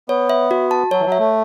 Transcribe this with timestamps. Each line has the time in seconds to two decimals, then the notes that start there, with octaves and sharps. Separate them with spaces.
0.09 B3 C#5
0.30 E5
0.51 F#4
0.71 A5
0.91 F#3 C#5
1.00 E3
1.06 F#3
1.12 E5
1.19 A3